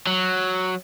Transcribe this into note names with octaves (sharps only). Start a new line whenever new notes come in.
F#3